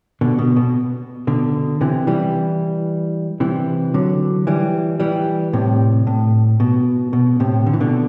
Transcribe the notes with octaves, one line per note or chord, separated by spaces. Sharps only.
B2 D3
B2
B2
B2 D3
C3 E3
E3 G3
C3 E3
D3 F#3
E3 G3
E3 G3
A2 C3
A2
B2
B2
A2 C3
D3
E3
B2 D3